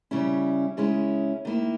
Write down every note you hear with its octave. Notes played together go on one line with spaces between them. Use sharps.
C#3 G3 C#4 E4
C#3 G#3 C#4 E4
D#3 A#3 E4